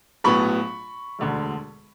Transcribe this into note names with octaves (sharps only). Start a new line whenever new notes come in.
A#1 A2 F#3 B3 B5 C#6
E1 D2 D3